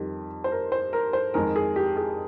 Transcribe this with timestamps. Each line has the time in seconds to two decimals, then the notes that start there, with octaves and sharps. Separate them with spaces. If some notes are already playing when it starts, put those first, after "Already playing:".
Already playing: F2 D#3 G3
0.44 C5
0.52 A#4
0.72 C5
0.93 A#4
1.13 C5
1.34 F2 D#3 G#3 A#4
1.56 G#4
1.76 G4
1.97 G#4